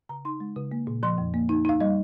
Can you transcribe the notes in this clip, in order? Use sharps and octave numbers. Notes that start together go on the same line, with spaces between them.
C#3 A#5
D#4 C6
G#3
C#3
A#3
A#2
F3 C6
F2
A#3
D#4
D#4 F5
G3 D#5